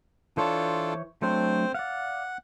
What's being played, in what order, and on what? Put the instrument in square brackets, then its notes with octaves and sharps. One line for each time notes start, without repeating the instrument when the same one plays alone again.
[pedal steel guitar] E3 C5 C#5 [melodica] D4 F4 A4
[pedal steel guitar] F#3 A3 D4 [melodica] C4 C5
[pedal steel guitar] D5 F5 [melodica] F#5